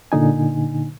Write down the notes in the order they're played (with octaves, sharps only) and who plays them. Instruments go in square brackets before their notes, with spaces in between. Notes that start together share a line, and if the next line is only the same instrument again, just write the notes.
[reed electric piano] A#2 D3 D#4 G#5